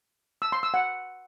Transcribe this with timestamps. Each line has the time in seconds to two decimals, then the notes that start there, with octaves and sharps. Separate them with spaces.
0.42 E6
0.52 C6
0.63 E6
0.74 F#5